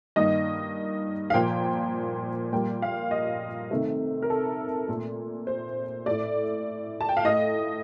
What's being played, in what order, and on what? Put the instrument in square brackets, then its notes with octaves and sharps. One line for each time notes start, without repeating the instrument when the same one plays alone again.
[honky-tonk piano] G2 D#3 A#3 D#5
F5
A#2 F3 A#3 G5
A#2 G3 A#3 G5
F5
D#5
C3 D#3 A3
A#4
A4
A#2 A3
C5
A2 A3 D5
A5
G5
F5
A2 A3 D#5